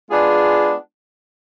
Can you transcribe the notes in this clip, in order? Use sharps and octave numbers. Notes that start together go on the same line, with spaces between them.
G#3 B3 D4 F4 G#4